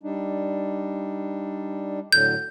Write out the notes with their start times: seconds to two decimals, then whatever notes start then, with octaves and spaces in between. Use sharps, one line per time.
0.03 G3 D4 D#4
2.12 A2 D3 F#3 G6